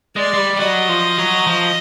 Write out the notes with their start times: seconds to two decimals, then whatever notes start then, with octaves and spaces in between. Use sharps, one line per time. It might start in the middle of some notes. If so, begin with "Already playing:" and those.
0.16 G#3 D5
0.34 G#3
0.37 G3
0.59 F#3 D#5
0.89 F3
1.18 F#3
1.47 F3